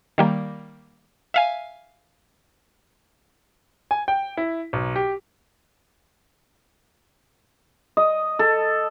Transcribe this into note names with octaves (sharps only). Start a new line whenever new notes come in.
D#3 G3 A#3
E5 F5 G#5
G#5
G5
E4
B1
G4
D#5
A4